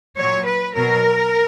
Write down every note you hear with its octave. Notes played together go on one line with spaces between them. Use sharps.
A#2 F#3 C#5
B4
B2 F#3 A#4